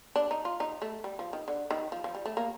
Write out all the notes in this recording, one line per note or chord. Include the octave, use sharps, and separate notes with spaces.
D4
D#4
F4
D#4
A3
G3
F3
D#3
D3
D#3
F3
F3
G3
A3
A#3